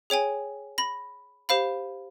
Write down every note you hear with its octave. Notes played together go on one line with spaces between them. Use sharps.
G#4 C#5 G5 G#5
B5 A#6
G4 C5 F5 B5